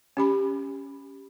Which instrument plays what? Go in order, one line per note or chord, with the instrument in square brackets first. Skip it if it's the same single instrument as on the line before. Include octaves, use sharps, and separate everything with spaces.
[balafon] C#4 G4 B5